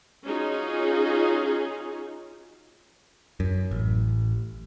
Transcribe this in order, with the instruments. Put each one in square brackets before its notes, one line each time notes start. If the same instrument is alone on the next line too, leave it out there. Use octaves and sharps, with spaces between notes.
[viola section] C#4 D#4 F4 F#4 G#4
[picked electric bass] F#2
A1